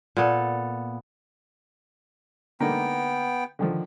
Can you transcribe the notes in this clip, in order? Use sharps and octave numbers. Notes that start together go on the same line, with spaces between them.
A#2 B3 A4
D3 A#3 B3 D#4 G5
D3 D#3 F3